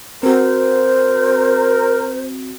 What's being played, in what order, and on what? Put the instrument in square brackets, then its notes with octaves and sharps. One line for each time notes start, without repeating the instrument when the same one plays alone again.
[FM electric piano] C4 F#4 [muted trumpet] A#4 [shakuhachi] C5